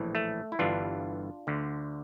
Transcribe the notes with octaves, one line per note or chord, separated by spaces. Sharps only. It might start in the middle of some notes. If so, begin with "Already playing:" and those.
Already playing: A#1 A2 E3
A3
E4
G1 G2 E3 D4 F4
D2 D3